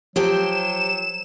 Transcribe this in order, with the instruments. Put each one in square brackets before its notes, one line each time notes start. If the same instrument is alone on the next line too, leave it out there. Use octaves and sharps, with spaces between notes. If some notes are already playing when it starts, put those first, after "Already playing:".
[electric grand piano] F3 [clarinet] F#3 [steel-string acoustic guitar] G4 C5 G5 [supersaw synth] E7